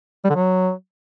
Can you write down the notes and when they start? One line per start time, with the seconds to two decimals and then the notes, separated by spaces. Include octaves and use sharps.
0.24 G3
0.30 D3
0.35 F#3